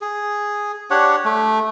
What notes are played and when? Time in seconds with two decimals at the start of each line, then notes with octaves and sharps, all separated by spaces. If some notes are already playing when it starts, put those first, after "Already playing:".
0.01 G#4
0.90 D4 G4 C#5 F#5
1.25 A3